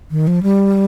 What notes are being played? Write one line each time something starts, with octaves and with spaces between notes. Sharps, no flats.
D#3
F3
G3